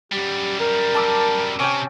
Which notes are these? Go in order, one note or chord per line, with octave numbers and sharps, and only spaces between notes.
F#2 G3 G4
A#4
A5 D6 E6
C3 C#4 G5